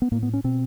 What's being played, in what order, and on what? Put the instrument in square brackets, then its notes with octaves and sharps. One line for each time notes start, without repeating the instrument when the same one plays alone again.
[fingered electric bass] B3
A2 A#3
B3
C#4
B2 C4